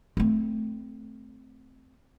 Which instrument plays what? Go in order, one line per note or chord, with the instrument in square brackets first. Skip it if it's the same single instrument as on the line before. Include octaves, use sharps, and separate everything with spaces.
[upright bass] A3 C4